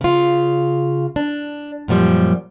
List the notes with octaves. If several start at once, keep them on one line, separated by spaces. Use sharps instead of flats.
C#3 F4
D4
F#2 A#2 F3 G3